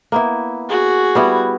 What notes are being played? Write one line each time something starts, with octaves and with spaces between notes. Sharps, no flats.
A#3 B3 E4
F#4 G#4
G3 B3 E4